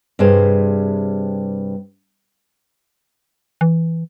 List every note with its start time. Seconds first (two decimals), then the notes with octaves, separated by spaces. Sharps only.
0.19 G2 C3 G3 G#4 C5
3.61 E3